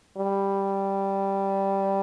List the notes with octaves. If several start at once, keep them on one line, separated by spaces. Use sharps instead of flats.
G3